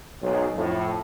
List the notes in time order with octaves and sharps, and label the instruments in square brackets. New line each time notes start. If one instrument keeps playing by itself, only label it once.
[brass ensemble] B1 G#2 F#3
F2 A2